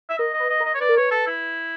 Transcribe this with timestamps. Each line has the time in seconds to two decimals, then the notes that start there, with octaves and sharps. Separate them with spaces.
0.10 E5
0.18 A#4 D#5
0.33 D#5
0.40 B4
0.49 D#5
0.60 A#4
0.65 D#5
0.75 C#5
0.80 B4 D5
0.89 A#4
0.97 B4 C#5
1.11 A4
1.27 E4